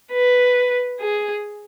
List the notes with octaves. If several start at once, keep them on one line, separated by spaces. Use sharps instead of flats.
B4
G#4